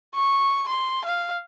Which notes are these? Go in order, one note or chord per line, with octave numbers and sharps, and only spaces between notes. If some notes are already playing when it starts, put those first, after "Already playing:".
C#6
C6
F5